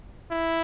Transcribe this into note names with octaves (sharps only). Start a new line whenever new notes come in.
E4